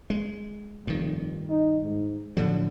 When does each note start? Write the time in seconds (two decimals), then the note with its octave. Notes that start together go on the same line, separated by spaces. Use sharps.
0.10 G#3
0.87 F1 G2 D#3
1.50 D#4
1.83 G#2
2.37 A2 D3 F3 F#3